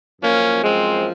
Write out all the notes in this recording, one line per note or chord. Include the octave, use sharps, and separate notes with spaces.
F#2 F3 A#3 C#4
G#3 C4